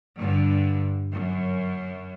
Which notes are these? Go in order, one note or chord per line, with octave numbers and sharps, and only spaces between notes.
G2 D3
F#2